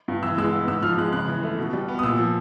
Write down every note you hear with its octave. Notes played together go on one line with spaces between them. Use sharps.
G2
E3 E6
G#3 E6
B3
G#2 E6
F3 F6
G#3 F#6
C#3 F#6
E3
A3
B2
G3
B3
D#6
A#2 E6
F3